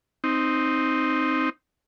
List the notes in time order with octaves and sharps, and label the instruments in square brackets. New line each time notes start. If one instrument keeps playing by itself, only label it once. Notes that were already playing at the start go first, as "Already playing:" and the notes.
[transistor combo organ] C4 D#4